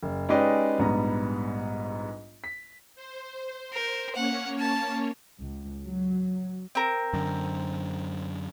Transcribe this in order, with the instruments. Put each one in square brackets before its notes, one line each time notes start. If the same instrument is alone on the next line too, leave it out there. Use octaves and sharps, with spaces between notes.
[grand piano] F#1
G#3 C#4 D#4 G4 B4 D5
A#1 G#2 G3 B3 A#5
B6
[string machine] C5
[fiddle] A#4
[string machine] A#3 C#4 C#5 [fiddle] F#5
[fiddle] A5
[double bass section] C#2
F#3
[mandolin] C4 A#4
[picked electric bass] F#2 D3